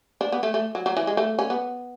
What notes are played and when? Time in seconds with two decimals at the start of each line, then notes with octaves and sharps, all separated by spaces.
0.21 D4
0.32 B3
0.43 A3
0.54 A3
0.75 F#3
0.86 F#3
0.97 E3
1.07 G#3
1.17 A3
1.39 C#4
1.50 B3